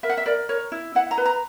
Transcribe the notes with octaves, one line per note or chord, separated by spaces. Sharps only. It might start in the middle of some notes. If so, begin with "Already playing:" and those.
A#4 E5
F#5
E5
A#4 D5
A#4 C#5
E4
E4 F#5
A#5
B4
A#5